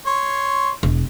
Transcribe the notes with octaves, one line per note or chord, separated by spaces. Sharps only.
C#5 C6
E1